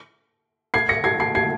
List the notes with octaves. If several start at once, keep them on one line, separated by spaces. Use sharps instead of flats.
G#6 C7
A#6 C#7
G#6 C7
G#6 C7
G#6 C7